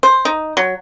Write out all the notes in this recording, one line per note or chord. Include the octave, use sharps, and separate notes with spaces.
C5
D#4
F#3